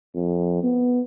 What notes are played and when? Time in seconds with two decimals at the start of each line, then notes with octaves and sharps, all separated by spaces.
0.15 F2
0.63 B3